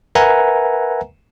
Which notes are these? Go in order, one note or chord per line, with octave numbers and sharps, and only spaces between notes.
A#4 B4 E5 F#5 G#5 A#5